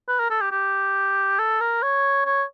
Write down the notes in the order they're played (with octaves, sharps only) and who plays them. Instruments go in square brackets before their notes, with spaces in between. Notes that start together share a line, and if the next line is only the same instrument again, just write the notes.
[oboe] B4
A#4
A4
G4
G4
A4
A#4
C#5
C#5